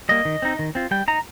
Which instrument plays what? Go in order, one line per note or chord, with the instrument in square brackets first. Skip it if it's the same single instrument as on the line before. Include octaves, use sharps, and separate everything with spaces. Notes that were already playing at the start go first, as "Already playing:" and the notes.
[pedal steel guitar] G3 A#3 D#5
D#3
C4 D#4
D#3
C4 F4
G3 G5
D#4 A#5